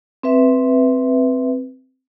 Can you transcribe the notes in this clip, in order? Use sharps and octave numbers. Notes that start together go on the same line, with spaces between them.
C4 B4 E5